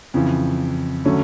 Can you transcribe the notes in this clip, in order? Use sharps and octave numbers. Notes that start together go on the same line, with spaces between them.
F2 C#3 E3
D3 F#3 A3 C#4